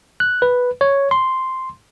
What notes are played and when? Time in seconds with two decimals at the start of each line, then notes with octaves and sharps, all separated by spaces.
0.20 F#6
0.42 B4
0.81 C#5
1.11 C6